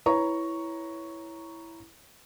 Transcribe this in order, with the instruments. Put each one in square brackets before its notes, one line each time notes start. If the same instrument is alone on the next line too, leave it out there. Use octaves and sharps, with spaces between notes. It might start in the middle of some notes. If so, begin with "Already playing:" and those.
[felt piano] E4 B4 C#5 A#5 C#6